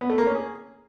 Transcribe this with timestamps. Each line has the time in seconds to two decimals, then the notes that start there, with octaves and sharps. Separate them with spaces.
0.01 B3
0.10 A3
0.18 A#3
0.26 C#4
0.35 G#4